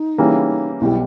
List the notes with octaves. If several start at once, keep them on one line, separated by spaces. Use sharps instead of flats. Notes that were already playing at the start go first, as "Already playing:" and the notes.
Already playing: D#4
C#3 E3 G3 A#3 C#4
B1 B2 G3 E4